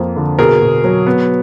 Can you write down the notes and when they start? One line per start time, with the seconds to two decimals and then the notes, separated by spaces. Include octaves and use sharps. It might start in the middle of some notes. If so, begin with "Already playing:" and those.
Already playing: F2 A#3
0.16 D3
0.39 B2 G#4 A#4
0.61 B2
0.84 F#3
1.07 B3